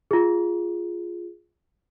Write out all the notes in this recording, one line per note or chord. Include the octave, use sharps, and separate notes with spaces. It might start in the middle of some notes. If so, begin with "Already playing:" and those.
F4 G#4